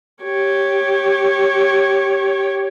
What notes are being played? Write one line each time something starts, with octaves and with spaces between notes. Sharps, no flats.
G4 C#5